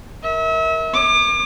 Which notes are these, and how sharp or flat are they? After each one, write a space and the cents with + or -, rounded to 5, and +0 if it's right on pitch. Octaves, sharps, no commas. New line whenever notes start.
A#4 +0 E5 -35
C#5 +0 D6 +35